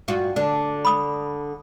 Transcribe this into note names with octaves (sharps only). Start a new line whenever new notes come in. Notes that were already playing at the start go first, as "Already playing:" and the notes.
G2 F4 F#4
D3 D4
B5 D#6